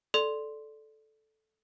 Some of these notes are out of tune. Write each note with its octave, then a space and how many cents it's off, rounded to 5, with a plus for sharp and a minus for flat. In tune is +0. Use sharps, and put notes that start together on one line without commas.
A4 -10 D5 +0 C6 +0